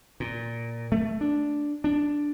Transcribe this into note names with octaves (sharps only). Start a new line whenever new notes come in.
A#2
A3
D4
D4